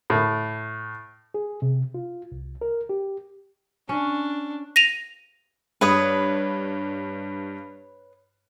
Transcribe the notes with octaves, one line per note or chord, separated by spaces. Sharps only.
A2
G#4
C3
F4
C2
A#4
G4
C#4 D4
A#6 D#7 F7
G2 B4 C#5 D#6